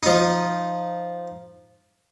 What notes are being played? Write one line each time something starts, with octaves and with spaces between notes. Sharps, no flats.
F3 D#4